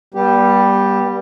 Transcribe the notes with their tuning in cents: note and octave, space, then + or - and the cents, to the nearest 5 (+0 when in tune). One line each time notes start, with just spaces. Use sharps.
G3 +0 B3 -35 G4 +0